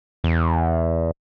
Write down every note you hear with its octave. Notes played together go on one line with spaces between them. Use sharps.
E2